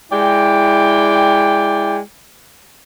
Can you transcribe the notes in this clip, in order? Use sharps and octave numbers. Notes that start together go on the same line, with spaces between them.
G#3 E4 D5 G5